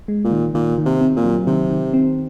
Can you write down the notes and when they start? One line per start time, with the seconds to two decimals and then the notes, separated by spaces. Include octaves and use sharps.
0.08 G#3
0.24 A#2
0.31 D#3
0.55 A#2 D#3
0.78 D#3
0.86 C3
1.01 C4
1.17 A#2
1.24 F#3
1.47 C3 D#3
1.70 D#3
1.94 C4